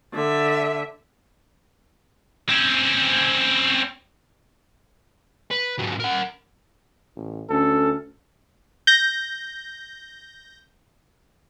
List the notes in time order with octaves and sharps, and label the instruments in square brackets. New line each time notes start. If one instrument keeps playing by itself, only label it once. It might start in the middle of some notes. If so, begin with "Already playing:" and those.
[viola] D3 E5
[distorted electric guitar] C4 C#4
B4
G#2 F#3
A#4 F#5
[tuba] A1
[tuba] D2 [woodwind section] C#4 [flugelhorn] A4
[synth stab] G6 A#6